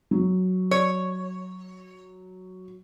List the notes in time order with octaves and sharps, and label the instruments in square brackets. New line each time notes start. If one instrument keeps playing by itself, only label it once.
[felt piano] F#3
[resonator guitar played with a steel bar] C#5